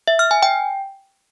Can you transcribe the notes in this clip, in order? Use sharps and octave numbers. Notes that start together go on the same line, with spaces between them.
E5
F6
G#5
G5